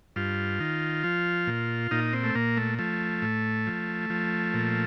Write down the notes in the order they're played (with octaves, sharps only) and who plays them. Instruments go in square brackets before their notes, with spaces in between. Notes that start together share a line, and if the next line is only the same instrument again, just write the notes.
[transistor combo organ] G2 F4
D#3
F3
A#2
A#2 D#4
C4
A3
A#2 A#3
A3
F3 A3
A2
F3
F3
A#2